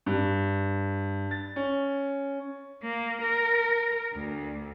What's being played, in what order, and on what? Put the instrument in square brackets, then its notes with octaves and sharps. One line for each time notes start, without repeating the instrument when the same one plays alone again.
[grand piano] G2
A6
C#4
[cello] A#3
A#4
D2